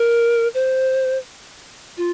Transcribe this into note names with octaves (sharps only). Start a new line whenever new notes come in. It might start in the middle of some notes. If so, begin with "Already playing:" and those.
Already playing: A#4
C5
F4